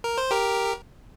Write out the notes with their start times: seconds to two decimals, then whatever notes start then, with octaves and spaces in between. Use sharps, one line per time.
0.04 A#4
0.18 C5
0.31 G4 A#4